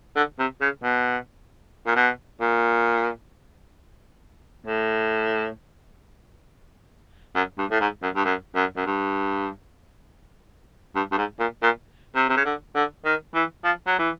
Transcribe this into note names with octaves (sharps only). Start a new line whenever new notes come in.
D3
C3
C#3
B2
A#2
B2
A#2
A2
F#2
G2
A2
G#2
F#2
G2
F#2
F#2
F#2
G2
G2
G2
G#2
A#2
A#2
C3
C3
C#3
D3
D3
D#3
E3
F3
F#3
E3